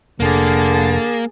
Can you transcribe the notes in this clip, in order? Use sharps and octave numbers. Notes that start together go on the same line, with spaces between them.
F1 D3 A#3 G#4 A5